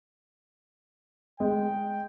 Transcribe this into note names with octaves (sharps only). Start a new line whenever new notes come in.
G#3 G5